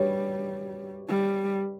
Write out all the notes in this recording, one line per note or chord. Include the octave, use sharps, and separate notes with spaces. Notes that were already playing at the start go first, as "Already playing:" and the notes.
Already playing: G3 G4 B4 C#5
G3